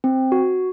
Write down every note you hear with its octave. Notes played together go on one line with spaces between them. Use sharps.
C4
F#4